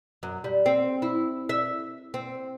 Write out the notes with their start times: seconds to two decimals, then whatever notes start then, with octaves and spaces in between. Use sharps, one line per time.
0.23 F#2
0.44 G3
0.66 C4
1.02 E4
1.49 E5
2.14 C4